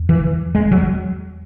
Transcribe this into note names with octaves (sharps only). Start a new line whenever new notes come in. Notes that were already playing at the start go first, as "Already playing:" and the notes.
Already playing: E2
E3
G#3
F#3